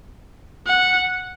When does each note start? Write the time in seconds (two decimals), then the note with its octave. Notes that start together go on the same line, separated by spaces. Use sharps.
0.67 F#5